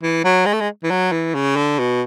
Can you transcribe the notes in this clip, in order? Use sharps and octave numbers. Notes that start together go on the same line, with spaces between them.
E3
F#3
G#3
A3
G#3
E3
F#3
E3
C#3
D3
B2